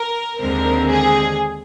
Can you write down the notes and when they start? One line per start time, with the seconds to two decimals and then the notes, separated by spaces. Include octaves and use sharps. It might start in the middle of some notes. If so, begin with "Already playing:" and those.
Already playing: A#4
0.40 D#2 D3 G#3 C4 A#4
0.90 G#4